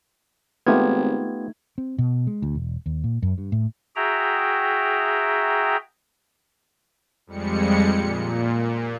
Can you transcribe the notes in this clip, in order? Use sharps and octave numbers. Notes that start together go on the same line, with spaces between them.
G#1 A3 B3 D#4 F4 G4 G#6
C4
B2
G#3
D2
E1
D#2
A#2
F#2
G2
A2
F#4 G#4 E5 G5 A#5
F2 G3 G#3 C#7
A#2